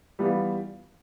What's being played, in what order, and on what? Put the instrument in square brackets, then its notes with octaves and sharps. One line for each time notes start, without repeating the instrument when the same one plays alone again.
[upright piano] E3 G3 B3 F4